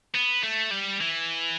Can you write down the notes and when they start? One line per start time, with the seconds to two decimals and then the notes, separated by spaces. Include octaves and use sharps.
0.15 B3
0.43 A3
0.71 G3
1.01 E3